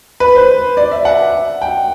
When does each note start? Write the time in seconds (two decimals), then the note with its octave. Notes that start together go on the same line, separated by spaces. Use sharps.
0.20 B4
0.35 C5
0.77 D5
0.91 E5
1.05 F#5
1.62 G5